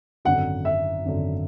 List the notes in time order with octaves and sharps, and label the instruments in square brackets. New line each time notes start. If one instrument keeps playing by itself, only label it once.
[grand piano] G#1 F#2 D3 [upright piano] F#5
[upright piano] E5
[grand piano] G#1 F#2 D3